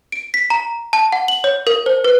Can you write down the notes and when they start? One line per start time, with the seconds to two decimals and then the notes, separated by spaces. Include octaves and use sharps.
0.12 D7
0.34 B6
0.50 A#5
0.93 A5
1.12 F#5
1.28 F#7
1.44 C#5
1.67 A#4
1.86 C5
2.04 B4